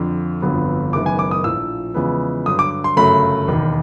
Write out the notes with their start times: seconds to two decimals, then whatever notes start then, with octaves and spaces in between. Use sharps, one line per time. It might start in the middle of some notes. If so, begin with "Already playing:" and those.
Already playing: F2 D3 F3
0.42 G1 F2 D3 F#3 B3
0.93 F#1 F#2 D#3 G#3 B3 D6
1.06 G#5
1.19 D6
1.31 D#6
1.44 A#1 A2 F3 E6
1.94 E2 C#3 F3 G#3 B3
2.46 G2 D3 F#3 D#6
2.59 D6
2.84 C6
2.97 G1 F#2 C#3 F#3 A3 B5
3.48 E1 D#2 D#3